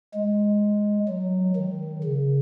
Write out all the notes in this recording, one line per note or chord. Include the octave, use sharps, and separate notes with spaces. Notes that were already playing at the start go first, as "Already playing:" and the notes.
G#3
F#3
D#3
C#3